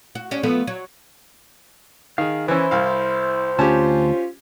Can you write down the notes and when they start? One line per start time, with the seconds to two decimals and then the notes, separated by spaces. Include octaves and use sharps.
0.15 F#4
0.31 C#4 D4 G4
0.43 F3 A3 B3
0.67 F#3
2.18 D#3 G#4 F5
2.48 E3 C#4 E4 C5
2.71 C2 F5
3.59 D2 C#4 F4 G4 G#5 A5